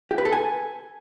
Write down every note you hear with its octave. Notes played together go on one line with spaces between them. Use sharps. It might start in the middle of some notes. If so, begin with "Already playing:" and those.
G4
B4
A4
G#5